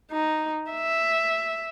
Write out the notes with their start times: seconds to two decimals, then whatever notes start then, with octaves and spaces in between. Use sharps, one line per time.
0.11 D#4
0.71 E5